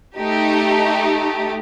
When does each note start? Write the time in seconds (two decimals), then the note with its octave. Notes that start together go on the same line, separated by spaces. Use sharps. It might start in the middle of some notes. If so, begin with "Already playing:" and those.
0.18 A3 D#4 G4